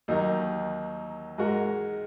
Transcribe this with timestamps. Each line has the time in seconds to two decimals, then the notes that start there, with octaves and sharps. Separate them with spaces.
0.08 D#2 D#3 F#3 D#4 A#4
1.38 G#2 G#3 F#4 A#4